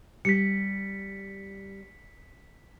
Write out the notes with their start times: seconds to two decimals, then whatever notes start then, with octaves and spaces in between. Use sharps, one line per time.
0.25 G3 B6 C#7